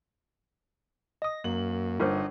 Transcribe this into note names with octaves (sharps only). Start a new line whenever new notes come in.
D#5 D#6 A#6
F#2 A#3 F#7
G1 D#4 F4 A#4 C5